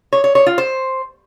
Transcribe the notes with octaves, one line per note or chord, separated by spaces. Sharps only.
C#5
C#5
C#5
F4
C5